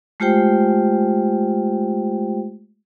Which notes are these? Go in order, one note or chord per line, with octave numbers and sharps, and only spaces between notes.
G#3 A3 F4 G4 C5 G5